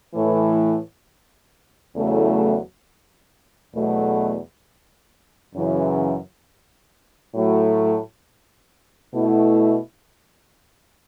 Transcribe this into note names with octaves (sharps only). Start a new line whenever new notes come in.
A2 E3 A3
E2 C#3 F#3 A3 E4
E2 B2 F#3 A3
F#2 C#3 E3
A2 F#3 A3
B2 A3 E4